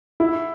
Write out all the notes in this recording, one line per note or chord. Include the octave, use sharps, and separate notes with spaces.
E4